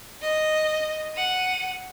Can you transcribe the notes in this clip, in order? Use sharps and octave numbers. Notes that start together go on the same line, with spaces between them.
D#5
F#5 D#7